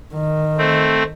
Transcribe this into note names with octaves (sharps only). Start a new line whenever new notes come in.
D#3
A3 C4